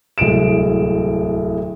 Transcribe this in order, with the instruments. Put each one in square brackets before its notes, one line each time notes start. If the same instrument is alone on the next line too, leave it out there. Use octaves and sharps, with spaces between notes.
[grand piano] D1 C2 G#3 D7 E7